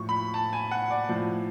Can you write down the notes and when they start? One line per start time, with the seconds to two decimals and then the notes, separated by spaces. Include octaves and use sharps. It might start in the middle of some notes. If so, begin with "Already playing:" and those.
Already playing: A2 F3 C#6
0.09 B5
0.34 A5
0.53 G#5
0.71 F#5
0.91 D5
1.09 A2 F3